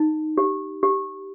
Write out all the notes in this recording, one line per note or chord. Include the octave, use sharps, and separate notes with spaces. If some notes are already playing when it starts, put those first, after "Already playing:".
Already playing: D#4
G4
G4